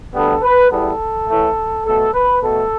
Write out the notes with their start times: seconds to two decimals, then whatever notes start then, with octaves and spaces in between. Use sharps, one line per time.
0.14 D2 D3 G3 B3 A4
0.42 B4
0.71 E2 E3 G3 B3 A4
1.28 A2 E3 A3
1.85 B2 A3 A4
2.13 B4
2.43 B2 A3 A4